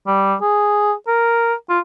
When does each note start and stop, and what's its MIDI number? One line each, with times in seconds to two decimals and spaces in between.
0.07 0.35 55
0.41 0.93 68
1.08 1.54 70
1.69 1.79 65